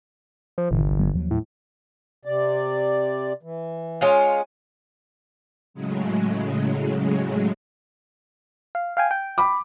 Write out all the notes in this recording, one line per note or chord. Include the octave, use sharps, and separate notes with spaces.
F3
G1 A#2 D#3 E3
C2
F#1 F#3 B3
D#2 F3 F#3
A2
C3 D5
E3
G#3 C#4 F4
A2 C#3 F#3 G#3
F5
F5 G5 G#5
G5
B5 D6